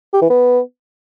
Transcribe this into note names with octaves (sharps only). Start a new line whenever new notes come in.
G4
E3
B3